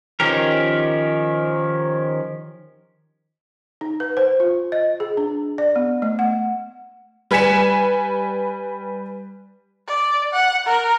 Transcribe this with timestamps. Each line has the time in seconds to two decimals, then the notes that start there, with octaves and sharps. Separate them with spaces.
0.20 D#3 F3 C#4 G4 A#4
3.81 D#4
4.00 B4
4.17 C5
4.40 F4
4.72 D#5
5.00 G#4
5.17 D4
5.58 D5
5.76 B3
6.02 A3
6.19 F#5
7.31 G3 B4 G#5 B6 C#7 E7
9.88 D5
10.34 F#5
10.67 A#4